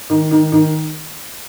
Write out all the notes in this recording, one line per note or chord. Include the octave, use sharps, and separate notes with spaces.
D#3
D#3
D#3